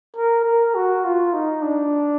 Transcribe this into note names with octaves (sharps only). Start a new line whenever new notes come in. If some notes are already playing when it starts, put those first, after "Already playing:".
A#4
A#4
F#4
F4
D#4
D4